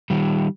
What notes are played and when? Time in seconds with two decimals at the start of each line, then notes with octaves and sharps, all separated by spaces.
0.10 D#3 G3